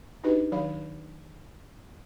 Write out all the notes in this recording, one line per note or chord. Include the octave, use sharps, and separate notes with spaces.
D4 D#4 F#4 G4 B4 D#5
D#3 F#3 F5 B5